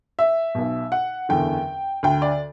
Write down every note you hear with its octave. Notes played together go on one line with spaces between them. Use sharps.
E5
B1 B2
F#5
F#1 E2 D3 G5
D2 D3 G5
D5